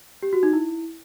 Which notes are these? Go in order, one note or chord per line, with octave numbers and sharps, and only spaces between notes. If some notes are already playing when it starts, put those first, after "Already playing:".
G4
F#4
D#4
E4